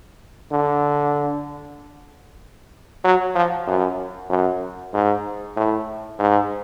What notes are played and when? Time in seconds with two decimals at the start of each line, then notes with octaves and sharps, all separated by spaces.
0.52 D3
3.04 F#3
3.35 F3
3.67 F#2
4.30 F#2
4.94 G#2
5.57 A2
6.19 G#2